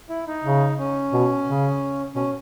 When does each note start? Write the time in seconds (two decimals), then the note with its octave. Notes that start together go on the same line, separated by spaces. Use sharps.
0.09 E4
0.27 D#4
0.44 C#3
0.79 C#4
1.13 B2
1.47 C#3
2.15 B2 C#4